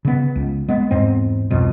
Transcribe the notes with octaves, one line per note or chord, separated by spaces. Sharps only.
C#3 B3
C#2
G#3 B3
E2 G#2 C4
C2 F2 B2